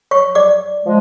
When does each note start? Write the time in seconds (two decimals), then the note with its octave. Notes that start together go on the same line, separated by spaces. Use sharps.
0.11 C#5 C#6
0.35 D5 D6
0.84 F3 G#3